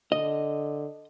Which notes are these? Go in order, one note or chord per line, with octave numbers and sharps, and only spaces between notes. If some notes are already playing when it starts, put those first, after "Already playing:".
D3 D#5